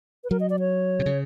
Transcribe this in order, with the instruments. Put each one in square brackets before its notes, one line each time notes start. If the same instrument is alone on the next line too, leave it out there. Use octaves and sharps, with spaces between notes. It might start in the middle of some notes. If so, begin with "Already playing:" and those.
[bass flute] B4
[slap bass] F#3 [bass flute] A#4
[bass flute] D#5
D5
C#5
[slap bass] C3
C#3